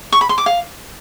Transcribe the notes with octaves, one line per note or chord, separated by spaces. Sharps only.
C#6
B5
C6
D6
F5